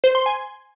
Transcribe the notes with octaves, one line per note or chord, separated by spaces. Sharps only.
C5
C6
G#5